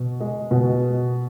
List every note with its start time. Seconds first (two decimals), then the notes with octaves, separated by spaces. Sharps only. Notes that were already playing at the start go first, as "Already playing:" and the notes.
Already playing: B2
0.20 G#3
0.51 B2